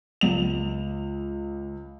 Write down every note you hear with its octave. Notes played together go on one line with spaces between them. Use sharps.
C#2 F7